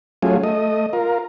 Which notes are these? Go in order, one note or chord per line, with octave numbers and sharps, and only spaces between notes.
F#3 A3 C#4 F4 G#4
A3 D#5
F4 A#4